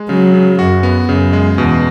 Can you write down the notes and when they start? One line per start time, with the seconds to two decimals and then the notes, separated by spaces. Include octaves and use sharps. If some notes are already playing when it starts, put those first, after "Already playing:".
Already playing: G#3
0.09 C#3 F#3
0.34 C#3
0.59 F#2 F#4
0.83 B3
1.08 F#2 C#3
1.33 G#3
1.58 E2 B2